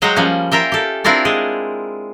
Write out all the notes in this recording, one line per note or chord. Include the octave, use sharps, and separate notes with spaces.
F#3 G#3 C5 F#5 G5 A#5
F3 G3 A#3 C#4
F4 A#4 E5 G5
G4 A4
C4 D4 E4 F4 A#4 D5
G#3 G#4